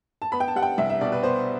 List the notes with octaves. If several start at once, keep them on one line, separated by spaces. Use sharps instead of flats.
A5
B3 B5
G5
A5
G3 F#5
G5
C2 E5
E5
B2 D5
B4
B3 C5